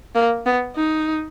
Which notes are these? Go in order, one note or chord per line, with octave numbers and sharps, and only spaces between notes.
A#3
B3
D#4